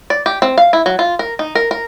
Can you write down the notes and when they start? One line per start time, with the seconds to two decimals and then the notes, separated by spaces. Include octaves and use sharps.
0.10 D5
0.26 G4
0.42 C4
0.58 F5
0.73 E4
0.86 F#3
0.99 F4
1.19 A#4
1.39 D#4
1.55 A#4
1.71 A#4